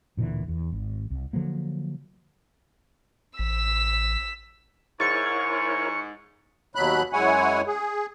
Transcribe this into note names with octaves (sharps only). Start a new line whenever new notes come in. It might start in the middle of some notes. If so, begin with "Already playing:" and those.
D1 A#2 D3 E3
E2
G#1
C2
D3 F3 F#3 A#3
A1 E6 B6
G#2 E4 A#4 C#5 C#6 A6 C#7
D#2 B2 F#3 B5 F#6
F#2 G#3 E4 C#5 F#5 G#5
G#4